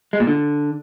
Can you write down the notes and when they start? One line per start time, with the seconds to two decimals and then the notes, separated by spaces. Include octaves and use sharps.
0.13 G#3
0.20 A#2
0.27 D3